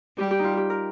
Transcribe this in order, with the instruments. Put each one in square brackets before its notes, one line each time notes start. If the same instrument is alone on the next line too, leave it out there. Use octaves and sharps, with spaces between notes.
[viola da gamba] G3 [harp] G4
[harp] G4
D#4 F4
G4
A#4